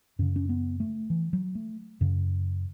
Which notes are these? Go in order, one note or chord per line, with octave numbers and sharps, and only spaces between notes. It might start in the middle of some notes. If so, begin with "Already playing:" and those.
F#2 C#3 C#4
C#4
B3
A3
E3
F#3
A3
F#2 C#3